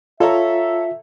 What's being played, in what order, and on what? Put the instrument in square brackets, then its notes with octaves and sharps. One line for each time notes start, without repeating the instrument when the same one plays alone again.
[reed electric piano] F4 [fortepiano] A4 C#5 A#5 [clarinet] E5